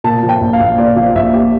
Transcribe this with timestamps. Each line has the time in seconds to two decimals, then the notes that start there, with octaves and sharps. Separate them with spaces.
0.04 A#2 A5
0.23 F3
0.29 G5
0.41 A#1
0.53 F5
0.60 A#1
0.78 A#2 D5
0.96 F3 F5
1.15 A#1 E5
1.34 A#1 G4